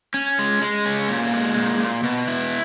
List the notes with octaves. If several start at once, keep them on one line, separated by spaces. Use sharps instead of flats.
C#4
G#3
G#3
C#4
A#2
G#3
A#2
A#2
B2
E4